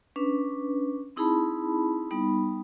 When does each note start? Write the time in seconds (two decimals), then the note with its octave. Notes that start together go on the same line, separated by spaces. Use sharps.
0.16 C#4 D4 B4
1.16 C4 D#4 E4 G#4 A5 B5
2.11 G3 B3 D#4 B5